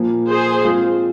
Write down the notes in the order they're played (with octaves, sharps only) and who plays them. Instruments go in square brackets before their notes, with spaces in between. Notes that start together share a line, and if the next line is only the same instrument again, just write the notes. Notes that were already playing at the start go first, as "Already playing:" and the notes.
Already playing: [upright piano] A#2 F3 A#3
[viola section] G#4 C5
[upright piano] G#3 C4 F4